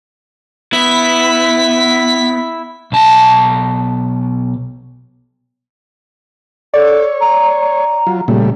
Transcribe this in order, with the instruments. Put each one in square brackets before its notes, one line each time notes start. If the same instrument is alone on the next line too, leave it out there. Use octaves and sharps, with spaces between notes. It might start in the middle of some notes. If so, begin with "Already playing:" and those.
[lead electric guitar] B3 [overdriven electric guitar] E4 [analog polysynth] B6
[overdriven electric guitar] B1 A5
[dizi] A4 [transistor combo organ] C#5 [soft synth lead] D5
[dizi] A#5
A#5
[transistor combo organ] F#3 F4
[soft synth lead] A#2 [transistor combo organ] C#3 G3 A3